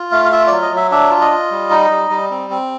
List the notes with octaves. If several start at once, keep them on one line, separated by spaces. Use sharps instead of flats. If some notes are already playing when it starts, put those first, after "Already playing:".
Already playing: F4
A3 F5
F5
F4 E5
F#3 D5
D#5
F#3
E5
D4 E5
F4
D#5
F4
G3
D#4
G3
G3
C4
C4